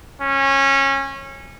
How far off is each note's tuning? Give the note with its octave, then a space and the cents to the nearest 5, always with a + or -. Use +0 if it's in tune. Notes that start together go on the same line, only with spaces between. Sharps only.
C#4 -20